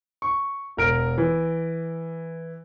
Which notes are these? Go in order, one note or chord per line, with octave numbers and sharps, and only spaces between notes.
C#6
E1 A#4 D7
E3